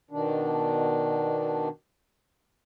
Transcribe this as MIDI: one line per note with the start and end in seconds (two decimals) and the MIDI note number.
0.11 1.68 47
0.11 1.68 51
0.11 1.68 62